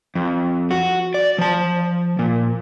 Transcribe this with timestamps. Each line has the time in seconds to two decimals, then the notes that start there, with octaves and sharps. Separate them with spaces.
0.15 F2
0.71 F#4
1.14 D5
1.38 F3 A5
2.19 A#2